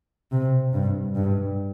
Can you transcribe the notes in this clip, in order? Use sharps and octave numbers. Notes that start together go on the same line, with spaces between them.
C3
G2
G2